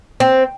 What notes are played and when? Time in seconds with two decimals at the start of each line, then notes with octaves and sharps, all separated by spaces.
0.20 C4